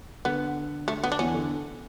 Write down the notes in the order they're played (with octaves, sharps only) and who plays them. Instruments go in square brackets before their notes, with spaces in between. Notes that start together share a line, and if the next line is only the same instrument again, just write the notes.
[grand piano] D3 [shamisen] B3
[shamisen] A3
B3
D4
[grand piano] E2 E3 [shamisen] C#4
[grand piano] D3